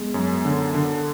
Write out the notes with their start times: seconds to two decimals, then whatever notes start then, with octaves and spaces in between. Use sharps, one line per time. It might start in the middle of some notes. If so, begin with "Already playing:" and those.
Already playing: G#3 B3
0.14 F#2
0.45 D3
0.75 D3